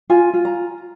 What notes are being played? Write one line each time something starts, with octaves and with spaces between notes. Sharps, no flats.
F4 G#5
F4
A#5